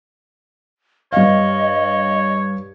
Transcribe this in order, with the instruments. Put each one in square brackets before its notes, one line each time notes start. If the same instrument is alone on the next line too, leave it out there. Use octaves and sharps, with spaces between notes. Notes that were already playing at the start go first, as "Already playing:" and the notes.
[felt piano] G2 F5 [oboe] C#5 [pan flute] D#5